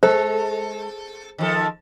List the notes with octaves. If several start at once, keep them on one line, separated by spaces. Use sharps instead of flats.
G#3 A4 C5
D#3 F3 A4